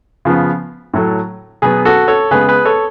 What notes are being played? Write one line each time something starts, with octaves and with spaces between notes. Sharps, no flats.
C#3 F3 B3
A2 F#3 A3
B2 F#3 B3 G#4 B4
F#4 A4
A4 C#5
C#3 G#3 B3 G#4 B4
G#4 B4
A4 C#5